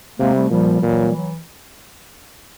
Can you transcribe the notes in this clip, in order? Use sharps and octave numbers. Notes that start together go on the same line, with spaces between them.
C3 G#3 A#3
G3 A3
A#2 F3 G3
G3
A#2 E3 F#3
G3
F#3